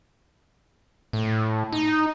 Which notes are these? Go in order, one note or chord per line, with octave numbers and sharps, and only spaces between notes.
A2
D#4